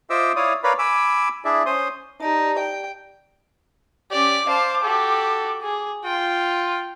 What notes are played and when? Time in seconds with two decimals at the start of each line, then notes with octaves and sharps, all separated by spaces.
0.10 F4 C5 D#5 E5 D6 E6
0.36 E4 C#5 D5 F5 D#6
0.64 A#4 B4 C#5 D5 F5 B5
0.79 G#5 B5 D6 E6
1.45 D4 E4 G#4 D5 E5
1.66 C#4 C5 C6 D#6
2.20 D#4 G4 D5 A5
2.58 G5
4.11 C#4 G4 D5 D6
4.47 C5 F5 A5
4.83 F#4 G4 A4
5.62 G#4
6.04 F4 G5